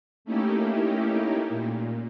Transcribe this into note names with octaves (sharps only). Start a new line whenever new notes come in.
A3 A#3 C#4 D#4 E4 G4
A#2